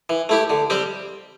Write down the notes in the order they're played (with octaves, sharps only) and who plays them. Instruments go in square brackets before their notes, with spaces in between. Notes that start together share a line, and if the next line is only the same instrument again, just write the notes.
[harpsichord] E3
A3 E4 G4
D3
G3 C4 G4